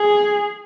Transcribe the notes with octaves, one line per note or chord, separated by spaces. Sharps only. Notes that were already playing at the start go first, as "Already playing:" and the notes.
Already playing: G#4